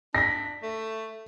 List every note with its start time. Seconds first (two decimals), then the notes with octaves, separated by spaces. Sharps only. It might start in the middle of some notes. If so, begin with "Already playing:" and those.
0.15 D4 A#6 B6
0.62 A3